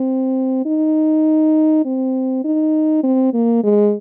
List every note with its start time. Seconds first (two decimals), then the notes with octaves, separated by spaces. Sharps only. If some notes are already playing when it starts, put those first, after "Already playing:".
Already playing: C4
0.66 D#4
1.85 C4
2.45 D#4
3.04 C4
3.34 A#3
3.64 G#3